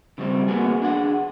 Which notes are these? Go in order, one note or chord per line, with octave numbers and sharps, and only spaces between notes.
C#3 F#3 G3 C4
A#3 B3 F#4 G#4
D4 G#4 F#5